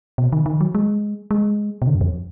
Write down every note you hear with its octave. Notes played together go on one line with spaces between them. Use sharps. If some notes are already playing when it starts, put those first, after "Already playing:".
B2
D#3
D#3
F#3
G#3
G#3
B2
D3
F#2
F2